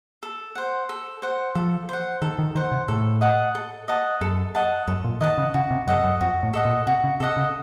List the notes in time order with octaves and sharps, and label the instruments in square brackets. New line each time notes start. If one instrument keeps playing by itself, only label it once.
[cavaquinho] A4
C5 F#5
A4
C5 F#5
[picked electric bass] F3 [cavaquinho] A4
[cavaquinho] C5 F#5
[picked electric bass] D#3 [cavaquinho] A4
[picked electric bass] D#3
[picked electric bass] D#3 [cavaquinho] C5 F#5
[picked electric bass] C3
[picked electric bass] A2 [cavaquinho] A4
[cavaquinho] D#5 F#5 A5
A4
D#5 F#5 A5
[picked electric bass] F#2 [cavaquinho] A4
[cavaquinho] D#5 F#5 A5
[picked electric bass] F#2 [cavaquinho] A4
[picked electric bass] A#2
[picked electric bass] D#3 [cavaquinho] D#5 F#5 A5
[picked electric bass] C#3
[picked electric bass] C#3 [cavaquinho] F#4
[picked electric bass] C3
[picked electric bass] F#2 [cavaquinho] A4 D#5 F#5
[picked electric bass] F#2
[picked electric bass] F2 [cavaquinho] F#4
[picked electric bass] A2
[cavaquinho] A4 D#5 F#5
[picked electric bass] A#2
[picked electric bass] C3 [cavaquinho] F#4
[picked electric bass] C#3
[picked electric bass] C3 [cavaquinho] A4 D#5 F#5
[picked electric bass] C#3